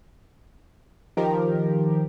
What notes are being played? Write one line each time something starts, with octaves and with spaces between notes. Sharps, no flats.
D#3 F3 G4 A#4